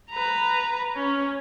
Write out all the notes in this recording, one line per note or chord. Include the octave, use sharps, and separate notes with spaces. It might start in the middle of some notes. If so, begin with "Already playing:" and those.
B4 A#5
C#4